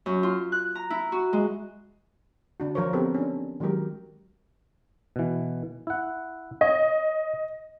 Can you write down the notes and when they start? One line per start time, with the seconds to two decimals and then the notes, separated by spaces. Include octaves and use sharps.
0.06 F#2
0.23 F4
0.52 F#6
0.75 A#5
0.90 E4
1.12 F#4
1.33 G#3
2.60 D3 D4 F#4
2.75 F3 F4 A#4 C5 C#5
2.93 B3 C4 G4 A4 A#4
3.14 C#4 D4
3.60 D#3 F#3 G#3 F#4 G4 A#4
5.16 B2 E3
5.87 E4 F#5
6.61 C#5 D#5